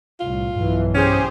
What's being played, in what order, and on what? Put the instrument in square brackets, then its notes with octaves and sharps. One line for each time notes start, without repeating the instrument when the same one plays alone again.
[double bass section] C2 A2 [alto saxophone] F4
[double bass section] B1 E3 [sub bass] G2
[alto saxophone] C#4 [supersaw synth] G4 G#4 C5